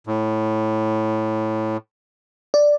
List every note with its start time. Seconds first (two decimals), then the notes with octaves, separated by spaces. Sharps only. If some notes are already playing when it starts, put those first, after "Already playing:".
0.07 A2
2.54 D5